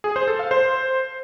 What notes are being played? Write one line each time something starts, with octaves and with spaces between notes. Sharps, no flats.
G#4
C5
A4
F5
C5